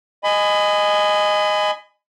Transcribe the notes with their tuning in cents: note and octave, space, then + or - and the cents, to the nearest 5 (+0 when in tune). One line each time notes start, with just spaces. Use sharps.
D#5 -10 G#5 +0 B5 +30